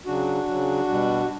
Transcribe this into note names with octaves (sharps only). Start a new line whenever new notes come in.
C#3 F#3 D4 F#4
C#3 F#3
B2 G3